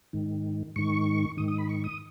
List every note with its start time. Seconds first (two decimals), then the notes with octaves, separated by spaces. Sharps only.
0.13 G#2 D#3
0.76 G#2 D#3 C#6
1.37 G#2 D#3 D#6
1.48 D#6
1.58 B5
1.69 C#6
1.84 D#6